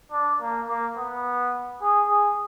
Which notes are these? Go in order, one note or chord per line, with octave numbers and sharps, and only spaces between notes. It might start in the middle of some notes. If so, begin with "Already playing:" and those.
D4
A#3
A#3
B3
G#4
G#4